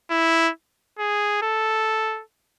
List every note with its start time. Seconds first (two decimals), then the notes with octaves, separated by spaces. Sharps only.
0.10 E4
0.99 G#4
1.42 A4